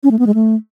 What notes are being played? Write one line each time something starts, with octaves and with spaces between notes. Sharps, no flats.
C#4
A3
B3
G#3
A3